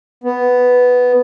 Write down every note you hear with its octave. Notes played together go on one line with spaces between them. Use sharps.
B3